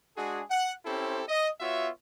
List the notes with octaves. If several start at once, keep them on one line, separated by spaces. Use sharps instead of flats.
G#3 D4 F#4 G#4
F#5
C4 C#4 E4 G4 A4 C5
D#5
B3 F4 F#4 C#5 E5